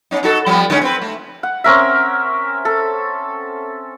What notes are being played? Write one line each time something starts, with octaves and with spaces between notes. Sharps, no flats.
B3 C#4 D#4
D#4 F#4 A4
F3 G3 B3
D3 G#3 C#4
C4 B4
A3
F#5
C4 C#4 A#4 E5
A4